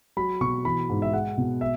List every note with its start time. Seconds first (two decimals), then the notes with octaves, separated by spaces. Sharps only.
0.17 F#3 B5
0.41 B2 C#6
0.65 E3 B5
0.89 G#2
1.02 E5
1.13 G#3 F#5
1.38 B2
1.61 E5